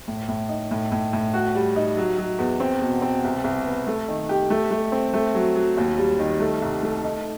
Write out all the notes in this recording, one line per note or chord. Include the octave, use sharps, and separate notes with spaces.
A2
A2
D#4
A2
A2
A2
F#4
G3
D#4
F#3
F#3
E2
C4
B2
C4
C2
C2
B3
A3
D#3
G4
A3
A3
C4
A3
F#3
F#3
D#2
G3
D#3
A3
C2
A3
D#4